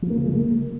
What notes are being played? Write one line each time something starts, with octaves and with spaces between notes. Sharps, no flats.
F3
A#3
C#3
G#3
A#3